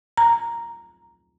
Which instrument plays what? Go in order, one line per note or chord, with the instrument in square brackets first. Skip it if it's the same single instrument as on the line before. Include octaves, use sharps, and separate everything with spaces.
[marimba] A#5